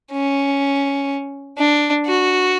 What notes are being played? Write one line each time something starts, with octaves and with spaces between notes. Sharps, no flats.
C#4
D4
F#4